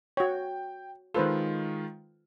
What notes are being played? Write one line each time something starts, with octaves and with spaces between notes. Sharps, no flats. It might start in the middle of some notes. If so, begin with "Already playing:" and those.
F#4 C#5 G5
D#3 G#3 F4 A4 B4 C5